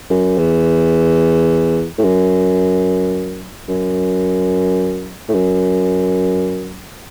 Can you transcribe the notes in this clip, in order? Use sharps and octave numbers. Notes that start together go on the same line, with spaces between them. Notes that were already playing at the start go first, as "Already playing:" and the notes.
F#2
E2
A2
F#2
F#2
A2
F#2